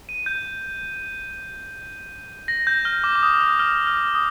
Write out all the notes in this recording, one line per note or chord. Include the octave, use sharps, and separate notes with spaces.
D#7
G6
A#6
G6
F6
D6
D6
D#6
F6
F6
F6
D#6